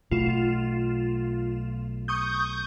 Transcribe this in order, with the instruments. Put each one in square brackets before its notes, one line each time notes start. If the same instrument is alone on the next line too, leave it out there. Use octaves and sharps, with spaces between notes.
[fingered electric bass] B1 B2 A3 [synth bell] F4 E7
[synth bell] C#6 D#6 G6